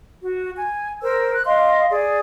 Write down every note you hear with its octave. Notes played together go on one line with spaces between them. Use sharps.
F#4
G#5
A#4 C5 E6
F#6
D#5 F5 C6
G#4 D5